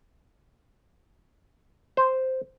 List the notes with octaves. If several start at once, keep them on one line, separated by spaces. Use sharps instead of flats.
C5